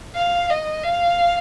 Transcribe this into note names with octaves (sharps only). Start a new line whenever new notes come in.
F5
D#5
F5